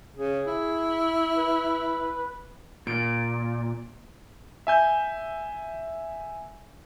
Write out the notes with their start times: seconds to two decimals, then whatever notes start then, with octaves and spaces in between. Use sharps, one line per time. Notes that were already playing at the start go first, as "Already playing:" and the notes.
0.16 C#3 G#4
0.47 E4
1.37 B4
2.87 A#2 D7
4.67 E5 G#5 G6